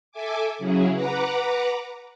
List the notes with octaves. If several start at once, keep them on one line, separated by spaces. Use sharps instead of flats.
A4 E5 G#5 D6
C#3 F#3 C#4 E4 G#4
B4 F#5 A#5 D6